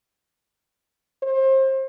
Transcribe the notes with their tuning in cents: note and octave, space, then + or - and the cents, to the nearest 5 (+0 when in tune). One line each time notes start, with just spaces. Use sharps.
C5 +30